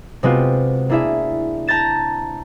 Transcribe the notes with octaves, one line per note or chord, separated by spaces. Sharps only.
C3 G#3 B3 C4 F4 F#4
A#3 D4 E4 G#4 E5
A5 A#5 G6 A6 E7